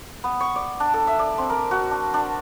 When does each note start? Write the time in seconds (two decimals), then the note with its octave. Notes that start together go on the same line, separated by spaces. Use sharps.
0.24 B3
0.41 C#6
0.56 D5
0.80 D4
0.94 A4
1.07 E5
1.19 D5
1.38 C4
1.50 A#4
1.71 F#4
1.91 D4
2.14 D4